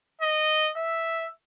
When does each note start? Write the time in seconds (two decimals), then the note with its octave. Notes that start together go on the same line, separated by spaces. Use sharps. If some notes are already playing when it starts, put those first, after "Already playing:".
0.21 D#5
0.77 E5